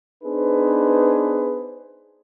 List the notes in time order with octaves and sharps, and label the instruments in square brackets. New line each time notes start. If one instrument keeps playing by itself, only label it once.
[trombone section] B3 D4 D#4 G#4 B4 C5